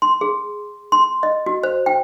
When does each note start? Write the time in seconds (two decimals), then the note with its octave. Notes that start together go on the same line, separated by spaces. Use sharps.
0.02 C6
0.21 G#4
0.92 C6
1.23 D#5
1.46 F#4
1.63 C5
1.86 G5